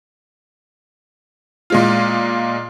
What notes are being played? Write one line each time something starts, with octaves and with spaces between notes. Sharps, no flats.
A#2 G#3 F4